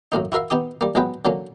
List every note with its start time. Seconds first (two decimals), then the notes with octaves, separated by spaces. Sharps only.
0.12 F#2 A2 A#3 D#4
0.32 E4 F#4 A#4 E5 F5
0.50 B3 D#4 G4 D#6
0.81 G3 A#3
0.95 A1 F#3 G#3 B3 B4 G5
1.25 D3 F#3 A#3 C#4